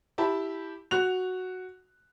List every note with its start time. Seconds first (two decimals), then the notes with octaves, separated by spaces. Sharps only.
0.18 E4 G4 A5 B5
0.91 F#4 F#6 F7